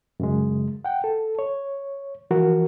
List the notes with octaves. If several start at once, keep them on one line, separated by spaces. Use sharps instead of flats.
F#2 C#3 G#3
F#5 G5
A4
C#5
E3 F3 F#4 A#4